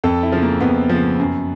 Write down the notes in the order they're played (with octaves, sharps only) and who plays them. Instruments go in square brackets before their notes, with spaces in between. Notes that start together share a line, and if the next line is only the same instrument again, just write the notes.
[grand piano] F2 A4
E4
C#3 F3
A#3
F2 B3
C#3 F3
F#2